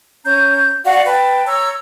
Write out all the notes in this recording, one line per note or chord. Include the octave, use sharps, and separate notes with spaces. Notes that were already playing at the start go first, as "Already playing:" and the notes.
C#4 A#5 G6
F#4 D5 F5 F#5
B4 G5 A5
C#5 A#5 E6